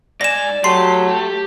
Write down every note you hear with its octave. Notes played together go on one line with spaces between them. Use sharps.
G#2 D5 G#5 A#6 E7
F#3 A3 G4 C6 C7
G4